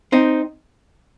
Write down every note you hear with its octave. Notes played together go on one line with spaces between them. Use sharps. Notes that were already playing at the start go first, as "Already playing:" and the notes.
C4 D#4